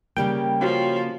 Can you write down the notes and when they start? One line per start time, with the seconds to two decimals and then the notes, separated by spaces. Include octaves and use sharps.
0.17 C#3 G3 A#3 G5
0.61 F3 C#4 F#4